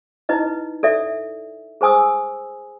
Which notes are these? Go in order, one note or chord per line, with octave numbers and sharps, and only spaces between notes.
D#4 E4 B4 D#5
A4 D5 E5
G#4 C5 G#5 D#6 E6